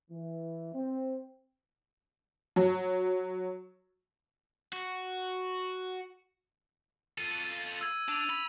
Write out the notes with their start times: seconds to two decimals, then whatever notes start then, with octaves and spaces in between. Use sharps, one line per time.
0.11 E3
0.74 C4
2.56 F#3
4.73 F#4
7.18 F4 A4 D#7
7.81 E6 G#6
8.09 D4 E6 D#7 F7
8.30 B5